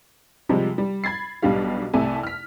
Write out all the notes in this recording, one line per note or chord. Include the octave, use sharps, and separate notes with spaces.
C3 F3 G3 G#3
G3
B5 G#6 A6 C7
B1 B2 G3 D4 G4 F5
C2 C3 A3 E5 G#5 A5
F6 B6